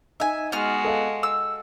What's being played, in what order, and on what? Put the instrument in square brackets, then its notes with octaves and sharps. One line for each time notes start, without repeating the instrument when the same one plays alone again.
[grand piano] D#4 [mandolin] E5 G#5
[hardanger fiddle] G#3 F#4 [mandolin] B3 F6
[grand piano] A4 D#5 F5
[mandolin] E6